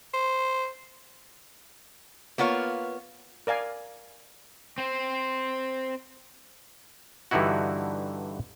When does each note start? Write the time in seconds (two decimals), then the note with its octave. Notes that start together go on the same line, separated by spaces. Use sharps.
0.14 C5
2.38 A#3 B3 F4 C#5
3.47 A#4 D5 F5 G#5
4.78 C4 C5
7.31 G2 D3 E3 D#4 E4 F#4